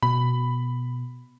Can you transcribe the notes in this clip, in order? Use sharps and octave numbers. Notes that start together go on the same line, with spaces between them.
B2 B5